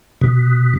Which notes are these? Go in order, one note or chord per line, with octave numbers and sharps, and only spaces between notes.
B2